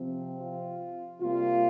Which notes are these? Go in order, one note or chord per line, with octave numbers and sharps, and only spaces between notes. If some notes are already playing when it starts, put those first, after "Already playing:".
Already playing: C3 F3 C4
F4
C3 G3 A#3 F4